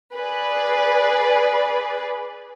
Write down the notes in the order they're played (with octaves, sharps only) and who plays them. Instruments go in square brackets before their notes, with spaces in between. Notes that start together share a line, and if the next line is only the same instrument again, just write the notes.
[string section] G#4 B4 D5